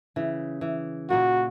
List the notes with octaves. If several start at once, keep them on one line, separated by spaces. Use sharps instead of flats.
C#3 E3
E3
A#2 A#3 F#4